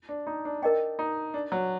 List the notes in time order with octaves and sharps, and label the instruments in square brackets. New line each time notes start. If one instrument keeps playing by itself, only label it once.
[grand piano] D4
D#4
D4
[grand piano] D4 [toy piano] A#4 D#5 G5
[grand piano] D#4
D4
F#3